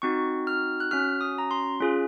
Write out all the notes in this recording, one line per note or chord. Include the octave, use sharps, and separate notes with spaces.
C4 D#4 F#4 C#6
F6
F#6
C#4 F#4 F6
D#6
A#5
C6
C#4 F4 G#4